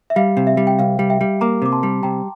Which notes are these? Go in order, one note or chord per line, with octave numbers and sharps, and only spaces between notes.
E5
G3 F5
C3
E5
G3
G5
C2 F5
G3
E5 G5
G3
A#3 A#5 D6
C3 D6
A5 C6
G3
C3 G5 A#5